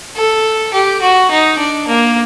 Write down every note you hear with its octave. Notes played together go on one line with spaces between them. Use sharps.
A4
G4
F#4
D#4
D4
A#3